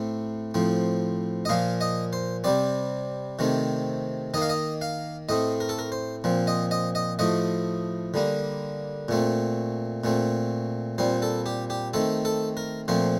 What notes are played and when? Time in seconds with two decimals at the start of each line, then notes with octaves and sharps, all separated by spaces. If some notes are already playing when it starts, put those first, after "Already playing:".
Already playing: A2 A3 C4
0.54 A2 F3 C4
1.45 D#5
1.49 A#2 F3 A#3 F5
1.81 D#5
2.13 C5
2.44 C3 G3 C4 D5
3.39 C3 D#3 A3 C4
4.34 D#3 D#5
4.37 A#3 F5
4.49 D#5
4.81 F5
5.29 A2 A3 C4 D#5
5.60 A#4
5.69 A4
5.79 A#4
5.92 C5
6.24 A#2 F3 C4
6.47 D#5
6.71 D#5
6.95 D#5
7.19 A2 F3 A3 D#5
8.14 D3 G3 A#3
9.08 A#2 A3 C4
10.04 A#2 A3 C4
10.98 A#2 G3 C4 C5
11.22 A4
11.46 G4
11.70 G4
11.94 D#3 A3 C4 A4
12.25 A4
12.57 A#4
12.88 A#2 F3 A3 C4 C5